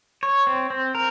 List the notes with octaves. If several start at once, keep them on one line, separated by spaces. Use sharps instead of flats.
C#5
C4
C4
A#4